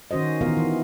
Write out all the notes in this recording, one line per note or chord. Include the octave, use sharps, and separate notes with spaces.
D#3 C#4 F#4 C5 D#5
D#3 E3 B3 F4 A#4 F5
E3